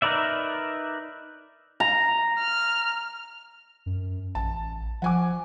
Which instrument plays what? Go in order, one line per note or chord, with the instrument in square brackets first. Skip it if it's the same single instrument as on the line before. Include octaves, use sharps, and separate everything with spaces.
[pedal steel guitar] D#4 A#4 B4 D5 E5
[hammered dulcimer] A#5
[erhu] F6
[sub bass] F#2
[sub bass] A1 [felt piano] A5
[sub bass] F3 [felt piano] F#5 G#5 D6